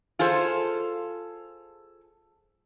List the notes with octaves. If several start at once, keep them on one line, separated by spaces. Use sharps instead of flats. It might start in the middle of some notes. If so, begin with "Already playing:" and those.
F4 G#4 A4 C5